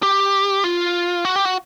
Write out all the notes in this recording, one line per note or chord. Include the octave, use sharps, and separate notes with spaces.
G4
F4
F#4
G4
F#4